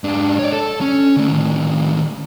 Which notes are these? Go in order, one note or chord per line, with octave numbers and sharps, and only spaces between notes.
G#2 D4
C#5 D5
A4
C#4
D3 A3
A2 D#3